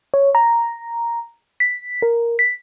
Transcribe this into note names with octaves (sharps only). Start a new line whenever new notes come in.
C#5
A#5
B6
A#4
B6